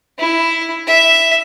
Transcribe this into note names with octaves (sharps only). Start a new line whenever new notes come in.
E4
E5